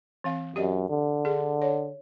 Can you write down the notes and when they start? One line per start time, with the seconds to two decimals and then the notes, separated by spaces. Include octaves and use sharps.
0.24 E3 C4 F5
0.56 F#2 G4 D5 D#5
0.89 D3
1.25 D4 G#4
1.62 C#5